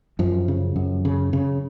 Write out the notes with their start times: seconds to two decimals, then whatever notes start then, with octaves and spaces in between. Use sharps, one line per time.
0.19 F#2 F3
0.48 C#3
0.76 F#2
1.05 C#3
1.33 C#3